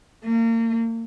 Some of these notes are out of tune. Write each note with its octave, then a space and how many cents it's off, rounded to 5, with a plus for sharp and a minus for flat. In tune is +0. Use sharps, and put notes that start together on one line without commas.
A#3 -35